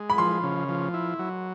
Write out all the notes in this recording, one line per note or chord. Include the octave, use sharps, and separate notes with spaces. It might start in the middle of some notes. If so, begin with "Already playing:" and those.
Already playing: G#3
B5
F3 C6
C#3
F3
E4
F#3